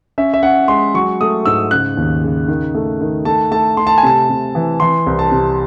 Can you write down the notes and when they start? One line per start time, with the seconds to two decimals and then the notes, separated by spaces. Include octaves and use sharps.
0.18 C#4 E5
0.34 E5
0.43 C#4 F#5
0.68 G#3 C6
0.94 F#3 C#6
1.21 A3 D#6
1.46 G#2 E6
1.71 C#3 F#6
1.97 D#2
2.24 C#3
2.48 D#3
2.75 A3
3.01 D#3
3.25 A3 A5
3.51 A3 A5
3.77 A3 C6
3.87 A5
3.98 G#5
4.03 C3 A5
4.29 C3
4.55 E3
4.80 E3 C6
5.06 C2
5.19 A5
5.31 C3